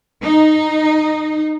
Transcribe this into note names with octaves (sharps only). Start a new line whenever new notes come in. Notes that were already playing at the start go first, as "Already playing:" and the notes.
D#4